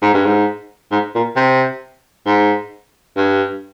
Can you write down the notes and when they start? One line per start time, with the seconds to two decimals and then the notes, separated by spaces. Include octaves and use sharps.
0.02 G#2
0.14 G2
0.26 G#2
0.91 G#2
1.15 A#2
1.36 C3
2.26 G#2
3.16 G2